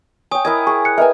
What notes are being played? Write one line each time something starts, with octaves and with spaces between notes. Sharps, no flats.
C#5 G5 G#5 D#6
E4 A#4 D#5 G#6
G#4 C#6
F#6 C#7
A#4 B4 D#5 E5 G5 G#5